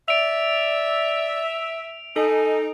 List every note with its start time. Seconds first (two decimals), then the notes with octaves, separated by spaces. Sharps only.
0.08 D5 E5 D7 F7
2.16 D#4 A4 G#5